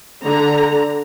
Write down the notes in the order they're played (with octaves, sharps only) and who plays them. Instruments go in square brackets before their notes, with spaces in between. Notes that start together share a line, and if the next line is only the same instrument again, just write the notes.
[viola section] D3 A#5